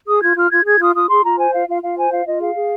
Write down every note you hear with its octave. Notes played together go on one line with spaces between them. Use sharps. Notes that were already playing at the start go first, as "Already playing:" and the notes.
G#4 D#6
F4 G#6
F4 F6
F4 G#6
G#4 G#6
F4 D#6
F4 D#6
G#4 C6
F4 A#5
C5 G#5
F4 F5
F4 F5
F4 F5
C5 G#5
F4 F5
F4 D#5
G#4 F5
G#4